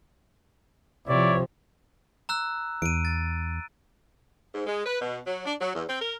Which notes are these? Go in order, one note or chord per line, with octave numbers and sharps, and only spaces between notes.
C3 F3 E4 C#5 D5
A#5 E6 F#6
E2 D7 D#7
A6
G#2
G#3
B4
B2
F#3
D4
F#3
E2
C4
A#4